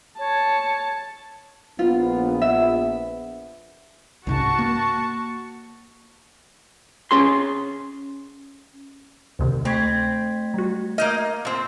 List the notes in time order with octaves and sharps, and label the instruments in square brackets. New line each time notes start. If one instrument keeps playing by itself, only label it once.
[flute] C#5 [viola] A5
[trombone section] A#1 B3 [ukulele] F4
[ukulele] E5
[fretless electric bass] C2 G#2 C#3 [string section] F#4 A5 C#6
[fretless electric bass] A#3
[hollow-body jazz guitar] C#4 G#4 C6
[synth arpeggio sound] D2 C3 D#3
[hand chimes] A3 G#6 B6 [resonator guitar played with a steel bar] C4
[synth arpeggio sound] G3 F#4
[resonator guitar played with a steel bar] A#3 D#5 [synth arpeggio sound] F6 G6
[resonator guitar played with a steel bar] A#2 C4